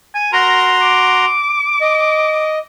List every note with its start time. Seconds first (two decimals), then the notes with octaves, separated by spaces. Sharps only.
0.14 G#5
0.33 F#4 A#4 A#5 C6
0.81 D6
1.81 D#5